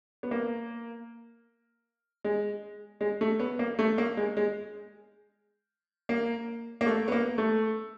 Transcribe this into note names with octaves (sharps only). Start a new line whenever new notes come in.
B3
A#3
G#3
G#3
A3
B3
A#3
A3
A#3
G#3
G#3
A#3
A#3
A3
B3
A#3
A3